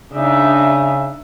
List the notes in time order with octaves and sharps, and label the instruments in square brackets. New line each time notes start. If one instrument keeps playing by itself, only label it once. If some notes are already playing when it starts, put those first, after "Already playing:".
[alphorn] C#3 [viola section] D4 D#4 E5